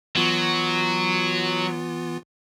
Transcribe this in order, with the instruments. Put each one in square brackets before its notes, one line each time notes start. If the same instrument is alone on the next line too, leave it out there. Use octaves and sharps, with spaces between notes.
[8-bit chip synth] E3 B3 F4 [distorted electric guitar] F#3